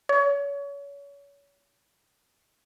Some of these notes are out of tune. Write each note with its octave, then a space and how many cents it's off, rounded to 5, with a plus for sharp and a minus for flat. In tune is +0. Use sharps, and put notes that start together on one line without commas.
C#5 +30